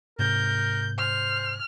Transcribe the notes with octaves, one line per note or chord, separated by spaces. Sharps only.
G#2 C3 A#4 G6
C5 F6